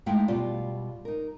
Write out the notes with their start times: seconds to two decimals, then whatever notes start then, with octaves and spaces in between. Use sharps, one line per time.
0.06 G#3 A3 D#4 E4 F5 G5
0.28 B2 G3 F4 D5
1.05 D#4 A#4